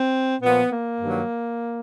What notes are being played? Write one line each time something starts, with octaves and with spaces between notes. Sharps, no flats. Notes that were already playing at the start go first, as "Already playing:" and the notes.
Already playing: C4
A#2 F3 B3
A#3
G2 D#3 F#3